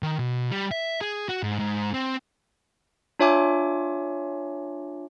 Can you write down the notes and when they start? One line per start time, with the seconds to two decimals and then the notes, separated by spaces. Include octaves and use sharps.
0.03 D#3
0.19 B2
0.51 G3
0.71 E5
1.01 G#4
1.29 F#4
1.43 G#2
1.59 G#2
1.94 C4
3.19 D4 F4 C#5 E5 G#5 D6